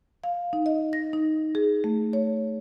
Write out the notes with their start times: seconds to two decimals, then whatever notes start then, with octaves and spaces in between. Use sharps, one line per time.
0.24 F5
0.53 D#4
0.66 D#5
0.93 A#6
1.13 D#4
1.55 G#4
1.84 A3
2.13 C#5